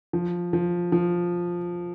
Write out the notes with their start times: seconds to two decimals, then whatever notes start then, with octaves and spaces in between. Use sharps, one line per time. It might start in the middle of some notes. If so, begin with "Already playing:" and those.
0.13 F3
0.53 F3
0.92 F3